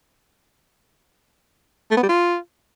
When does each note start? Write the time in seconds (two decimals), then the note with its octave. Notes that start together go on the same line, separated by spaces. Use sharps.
1.91 A3
1.97 B3
2.03 G3
2.09 F4